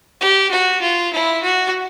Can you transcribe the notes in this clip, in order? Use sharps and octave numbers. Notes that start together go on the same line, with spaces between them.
G4
F#4
F4
E4
F#4